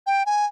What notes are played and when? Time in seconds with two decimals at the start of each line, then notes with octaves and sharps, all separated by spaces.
0.07 G5
0.26 G#5